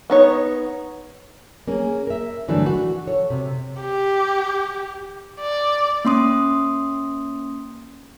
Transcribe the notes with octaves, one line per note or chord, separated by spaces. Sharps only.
B3 D#4 C#5
A#3 C#4 G#4
A#4 E5
G2 D3 E3 F#3 A3 D4
F#4
A4 C#5
C3
G4
D5
A#3 C#4 C6 D#6